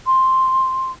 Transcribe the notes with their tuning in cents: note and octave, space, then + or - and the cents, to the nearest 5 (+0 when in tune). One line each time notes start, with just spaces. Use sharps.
C6 +5